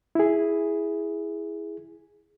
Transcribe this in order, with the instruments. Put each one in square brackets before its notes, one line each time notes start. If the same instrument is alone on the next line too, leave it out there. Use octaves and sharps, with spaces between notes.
[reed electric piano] E4 G#4